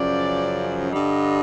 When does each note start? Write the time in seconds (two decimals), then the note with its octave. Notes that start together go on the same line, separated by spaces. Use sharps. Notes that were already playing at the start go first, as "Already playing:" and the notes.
Already playing: F#2 C#3 F3 D5
0.90 G2 D3 G3 D#5